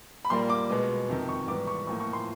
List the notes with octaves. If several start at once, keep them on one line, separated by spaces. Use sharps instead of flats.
B5
A#2 G3 A#3 C6
D6
B2 G#3 B3
F2 C3 D#3
C#6
G#2 E3 G3 B3 D6
C#6
A2 F3 A#3 C#6
C#6
C6